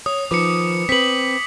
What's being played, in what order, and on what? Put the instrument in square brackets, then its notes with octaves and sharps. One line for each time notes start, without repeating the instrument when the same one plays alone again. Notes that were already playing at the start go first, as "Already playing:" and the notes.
[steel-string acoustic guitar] C#5 [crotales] D#6
[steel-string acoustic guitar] D#3 F3 B4 [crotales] D6 C#7
[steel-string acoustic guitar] C4 B4 [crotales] B6 F#7